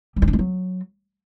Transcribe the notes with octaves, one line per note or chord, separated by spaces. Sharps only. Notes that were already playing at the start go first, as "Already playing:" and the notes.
G3
C#4
D4
G#3
F#3